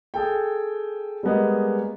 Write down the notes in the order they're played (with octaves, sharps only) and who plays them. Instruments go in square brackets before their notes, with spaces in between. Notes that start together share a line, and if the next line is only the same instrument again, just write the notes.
[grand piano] G#4 A4 G5
G3 G#3 A#3 B3 G#4 D#5